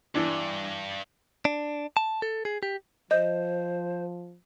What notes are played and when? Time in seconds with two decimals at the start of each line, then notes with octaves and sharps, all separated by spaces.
0.15 G2 E3 D4
1.45 D4
1.97 A5
2.22 A4
2.45 G#4
2.63 G4
3.11 F3 C5 D#5 G6